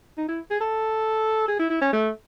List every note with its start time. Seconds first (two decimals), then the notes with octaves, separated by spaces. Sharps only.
0.18 D#4
0.28 E4
0.50 G#4
0.60 A4
1.48 G#4
1.59 E4
1.70 E4
1.81 C#4
1.93 A3